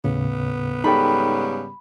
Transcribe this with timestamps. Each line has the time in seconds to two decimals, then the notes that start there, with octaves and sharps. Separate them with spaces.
0.04 D#2 A2 C#3 B3
0.84 G#2 C#3 G3 D#4 A4 G5 B5